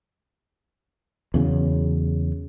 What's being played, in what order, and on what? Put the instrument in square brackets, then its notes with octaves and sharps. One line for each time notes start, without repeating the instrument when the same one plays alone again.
[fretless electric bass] E2 C#3 F#3